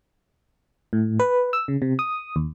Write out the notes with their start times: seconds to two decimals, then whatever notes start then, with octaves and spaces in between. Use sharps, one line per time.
0.93 A2
1.19 B4
1.53 E6
1.68 C#3
1.82 C3
1.99 D#6
2.36 D#2